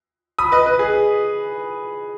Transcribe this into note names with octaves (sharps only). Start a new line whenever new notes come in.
B5 D#6
B4 D#5
B4
G#4